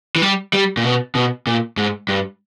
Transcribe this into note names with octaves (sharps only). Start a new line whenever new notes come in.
E3
G3
G3
A#2
B2
B2
A#2
G#2
G2